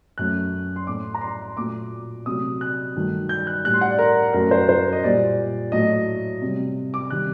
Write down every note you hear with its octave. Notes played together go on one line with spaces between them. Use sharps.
F#2 F#3 A3 F#6
C6
A2 A3 D6
A#5
C6
A#2 F#3 A3 D6
C3 F#3 A3 D#6
F#6
G2 D#3 F#3 A3
G6
F#6
A2 G3 F#6
C6
F#5
D5
A#4
F#2 F#3 A3 A#4
C5
C5
D#5
A#2 G3 D5
A2 F#3 A3 D#5
C3 G3
D6
C3 D#3 G3 F#6